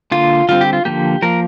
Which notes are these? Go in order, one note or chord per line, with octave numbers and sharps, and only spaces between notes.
D3 A#3 F4
D3 G3 C4 F4
G4
F4
D3 F3 A#3 G4
F3 A#3 A#4